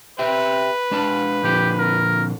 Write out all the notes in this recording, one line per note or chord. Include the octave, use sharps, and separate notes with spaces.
G4 B4 E5 G5
G#3 D4 A5
A#2 D3 F3 G4
A#4